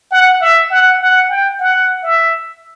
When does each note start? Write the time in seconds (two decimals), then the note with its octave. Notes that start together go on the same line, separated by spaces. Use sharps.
0.11 F#5
0.41 E5
0.71 F#5
1.00 F#5
1.30 G5
1.59 F#5
2.04 E5